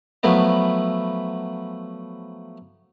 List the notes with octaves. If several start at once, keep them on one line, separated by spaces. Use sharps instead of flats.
F3 F#3 A3 B3 E4